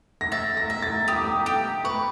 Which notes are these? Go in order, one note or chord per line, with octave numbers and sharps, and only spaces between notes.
A#6
E5 A6
A#6
E5
A6
G4 D#6
D6
D#6
G4
B4 C#6